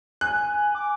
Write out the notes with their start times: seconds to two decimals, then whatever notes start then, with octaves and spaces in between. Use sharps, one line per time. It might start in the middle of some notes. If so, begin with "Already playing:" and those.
0.21 G#5 F#6
0.75 D6